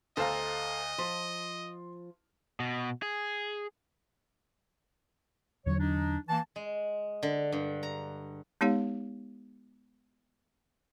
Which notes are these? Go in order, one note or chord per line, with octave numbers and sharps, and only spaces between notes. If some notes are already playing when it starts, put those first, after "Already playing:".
D2 A4 C5 D#5 F5 A#5
F3 C6
B2
G#4
E2 D3 F#3 C#5
D4 D#4
E3 A#3 A5
G#3
D3
G2
A#5
G#3 B3 D#4 G4 C#5 F5